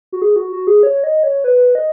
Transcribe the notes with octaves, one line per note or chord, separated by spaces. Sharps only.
F#4
G#4
F#4
F#4
G#4
C#5
D#5
C#5
B4
D#5